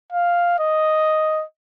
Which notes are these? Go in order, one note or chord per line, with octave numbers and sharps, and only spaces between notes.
F5
D#5